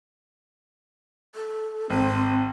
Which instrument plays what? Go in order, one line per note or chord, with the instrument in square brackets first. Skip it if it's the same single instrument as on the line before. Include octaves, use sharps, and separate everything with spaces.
[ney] A4
[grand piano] G#1 [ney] C4